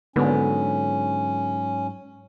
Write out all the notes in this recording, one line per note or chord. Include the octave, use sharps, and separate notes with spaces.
G#2 D3 F#3 B3 C#4